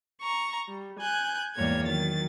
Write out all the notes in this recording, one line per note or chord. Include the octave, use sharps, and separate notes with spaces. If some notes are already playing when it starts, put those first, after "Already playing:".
A#5 C#6
G3
G#5 F#6 G6
E2 G#2 G3 A#3 C#5 G#6
D#3 F#3 A6